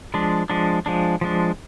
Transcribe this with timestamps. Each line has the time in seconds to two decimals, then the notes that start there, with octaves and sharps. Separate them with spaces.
0.14 F3 G#3 D4
0.50 F3 G#3 D4
0.86 F3 G#3 D4
1.21 F3 G#3 D4